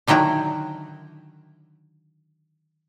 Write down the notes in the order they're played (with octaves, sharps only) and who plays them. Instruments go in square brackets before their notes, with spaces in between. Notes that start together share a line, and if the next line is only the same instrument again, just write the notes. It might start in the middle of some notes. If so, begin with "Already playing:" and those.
[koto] D3 D#3 F#3 E4 G5